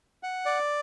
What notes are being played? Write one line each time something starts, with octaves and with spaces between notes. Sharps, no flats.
F#5
D5